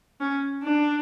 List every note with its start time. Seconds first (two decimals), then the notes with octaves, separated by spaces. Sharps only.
0.20 C#4
0.64 D4